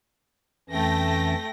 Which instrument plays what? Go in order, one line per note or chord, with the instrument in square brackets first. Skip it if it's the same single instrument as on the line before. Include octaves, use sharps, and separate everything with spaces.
[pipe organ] F2 E3 C#4 [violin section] A3 G5 A#6